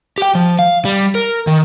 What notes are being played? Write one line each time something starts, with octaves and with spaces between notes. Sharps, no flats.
G4 G5
F3
F5
G3
A#4
D#3